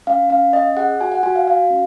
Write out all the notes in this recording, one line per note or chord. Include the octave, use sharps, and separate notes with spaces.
C#4 F5
C#4 F5
C#4 D#5
G#4 F#5
F#4 G#5
F#5
F#4 G#5
F5
F#4 F5
C#4